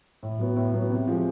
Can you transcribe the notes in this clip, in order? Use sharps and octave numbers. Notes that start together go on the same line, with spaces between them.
A2
F#3 B3
A2
F#3 B3
C3
F3 G#3